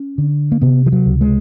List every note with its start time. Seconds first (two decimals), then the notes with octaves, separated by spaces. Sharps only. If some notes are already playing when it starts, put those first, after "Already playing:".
Already playing: C#4
0.18 D3
0.52 A#3
0.61 C3 B3
0.86 F3
0.92 F#3
1.06 C#2
1.21 G#3